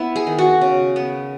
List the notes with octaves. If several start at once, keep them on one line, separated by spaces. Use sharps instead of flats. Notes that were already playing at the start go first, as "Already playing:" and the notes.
Already playing: B3 E4
G#4
D#3
F#4
C#3
B3